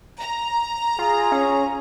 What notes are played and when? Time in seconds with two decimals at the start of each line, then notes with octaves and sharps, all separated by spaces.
0.20 A#5
0.99 F4 G#4
1.32 C#4